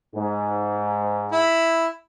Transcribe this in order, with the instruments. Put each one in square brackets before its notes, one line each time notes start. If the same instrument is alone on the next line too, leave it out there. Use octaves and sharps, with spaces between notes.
[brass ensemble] G#2
[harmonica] E4